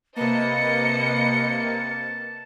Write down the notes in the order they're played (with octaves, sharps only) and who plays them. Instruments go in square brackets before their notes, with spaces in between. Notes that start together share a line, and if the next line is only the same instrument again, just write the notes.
[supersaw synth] C3 A#3 [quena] B4 [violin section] D#5 C#7 [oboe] A5